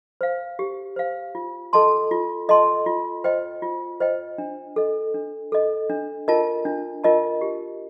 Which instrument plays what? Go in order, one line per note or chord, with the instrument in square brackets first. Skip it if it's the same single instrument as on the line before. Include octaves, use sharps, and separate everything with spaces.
[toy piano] C5 F5
G4
C5 F5
F4
A4 D#5 A5 C6
F4
A4 D#5 A5 C6
F4
C5 D#5 G5
F4
C5 D#5 G5
D4
A4 D#5
D4
A4 D#5
D4
F4 A#4 D#5 A5
D4
F4 A#4 D#5 A5
G4